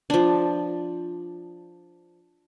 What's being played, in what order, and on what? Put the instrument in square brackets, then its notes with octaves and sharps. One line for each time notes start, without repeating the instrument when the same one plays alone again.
[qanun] F3 D4